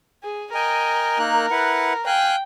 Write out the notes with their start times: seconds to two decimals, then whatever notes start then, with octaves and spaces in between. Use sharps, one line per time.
0.23 G#4
0.54 A#4 D#5 G5 G#5
1.19 A#3 D#4 F#6
1.51 E4 B4 F#5
2.06 F5 G5 G#5 F#6